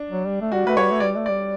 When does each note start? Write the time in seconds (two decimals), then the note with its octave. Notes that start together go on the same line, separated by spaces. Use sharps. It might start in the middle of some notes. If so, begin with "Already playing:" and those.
Already playing: D4
0.10 F#3
0.27 G3
0.41 A3
0.52 G3 F#4
0.66 A3 B4
0.77 G3 C#5
0.91 A3
1.00 D5
1.03 G3
1.16 A3
1.26 D5
1.29 G3